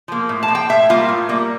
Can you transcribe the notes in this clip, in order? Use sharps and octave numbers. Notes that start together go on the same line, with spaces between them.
F3 A#3
A2
A5
F3 A#3
G5
A2 E5
G3 A#3 F4
A2
G3 A#3